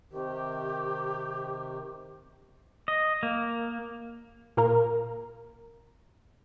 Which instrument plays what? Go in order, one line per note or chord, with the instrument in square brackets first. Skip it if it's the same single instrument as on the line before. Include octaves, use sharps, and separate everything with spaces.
[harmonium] C3 D#3 [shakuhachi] G4
[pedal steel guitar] D#5
A#3
[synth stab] A#2 A#3 A#4